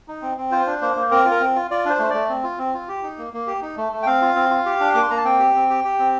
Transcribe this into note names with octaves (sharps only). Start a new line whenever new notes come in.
D#4
C4
C4
F4 C5
D4
A#3 C5
A#3
C4 A#4
F4
A#4
C4
F4
F4 D5
D4 C5
A3 C5
A3 D5
C4
F4
C4
F4
G4
D#4
A#3
A#3
G4
D#4
A3
A3
G5
C4 F5
F4
C4
F4
G4
D4
A#3 D6
C6
A#3 A#5
A5
C4 G5
G4
C4
G4
G4
C4